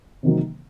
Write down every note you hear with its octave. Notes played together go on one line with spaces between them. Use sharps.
C3 D#3 F#3 A#3